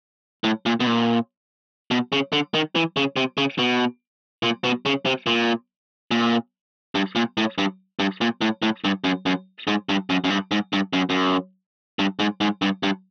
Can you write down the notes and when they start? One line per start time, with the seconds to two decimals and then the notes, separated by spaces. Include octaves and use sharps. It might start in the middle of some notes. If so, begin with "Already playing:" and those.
0.44 A2
0.66 A#2
0.80 B2
0.87 A#2
1.91 B2
2.12 C#3
2.33 D3
2.54 D#3
2.76 E3
2.97 C#3
3.16 C3
3.38 C#3
3.59 B2
4.43 A#2
4.64 B2
4.86 C#3
5.06 C3
5.27 A#2
6.11 A#2
6.95 G2
7.16 A#2
7.37 A2
7.58 G2
7.99 G2
8.21 A#2
8.41 A2
8.62 A2
8.84 G2
9.04 F#2
9.26 F#2
9.67 G#2
9.89 G2
10.10 F#2
10.24 F#2
10.30 G2
10.51 G#2
10.73 G2
10.93 F#2
11.10 F#2
11.99 G2
12.19 G#2
12.41 G#2
12.62 G2
12.83 G2